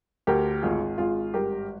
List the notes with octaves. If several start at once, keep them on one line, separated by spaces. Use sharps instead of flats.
D2 G4 A#4
G#1 F4 G#4
G#1 F4 G#4
G2 G4 A#4